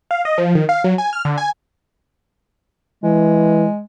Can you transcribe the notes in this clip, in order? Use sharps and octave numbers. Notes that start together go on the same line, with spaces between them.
F5
D#5
F3
D#3
F5
F#3
G#5
F6
D3
G#5
E3 G#3